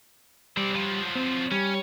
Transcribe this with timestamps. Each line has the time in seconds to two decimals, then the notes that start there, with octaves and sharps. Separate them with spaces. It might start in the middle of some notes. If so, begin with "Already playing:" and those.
0.57 G3 C4 D5
0.75 F3 F#3
1.15 C4
1.51 G3 C#4